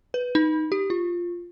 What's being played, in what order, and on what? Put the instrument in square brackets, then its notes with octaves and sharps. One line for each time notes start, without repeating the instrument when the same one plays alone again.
[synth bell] B4
D#4
G4
F4